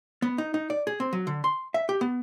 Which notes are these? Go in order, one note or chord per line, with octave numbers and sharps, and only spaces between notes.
B3
D#4
D#4
D5
G#4
C4
F#3
D3
C6
E5
G4
B3